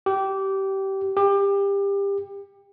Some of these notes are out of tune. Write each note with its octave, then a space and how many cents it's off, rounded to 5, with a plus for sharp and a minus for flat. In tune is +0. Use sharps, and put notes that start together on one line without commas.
G4 -20
G4 +25